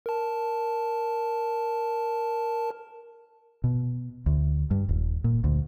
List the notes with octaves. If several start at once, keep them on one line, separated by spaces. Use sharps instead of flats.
A#4 A5
B2
D2
G2
D#1
A#2
D2